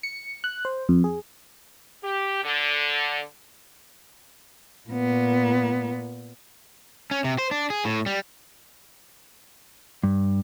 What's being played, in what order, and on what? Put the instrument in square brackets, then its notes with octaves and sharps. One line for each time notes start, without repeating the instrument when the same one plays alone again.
[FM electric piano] C#7
F#6
C5
F2
G#4
[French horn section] G4
D3
[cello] A#2 B3
[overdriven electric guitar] C#4
C3
C5
D4
G#4
A2
G3
[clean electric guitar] G2